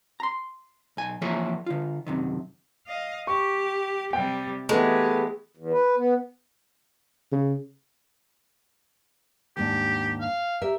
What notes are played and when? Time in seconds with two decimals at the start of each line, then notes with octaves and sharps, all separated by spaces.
0.20 A#5 C6
0.97 B1 G#5
1.21 E3 F3 A#3 G#4 C#5 E5
1.66 D3 F4
2.07 F#2 C3 D#3
2.87 D#5 F5
3.27 G4 C#6
4.13 C3 G3 G5
4.69 E3 G#3 A3 B3 G4
5.57 E2
5.73 B4
5.97 B3
7.32 C#3
9.57 D#2 G#2 D4 G4
10.21 F5
10.62 G4 A#4 E5